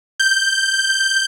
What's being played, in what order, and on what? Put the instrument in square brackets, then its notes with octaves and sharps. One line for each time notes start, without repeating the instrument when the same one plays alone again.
[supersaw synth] G6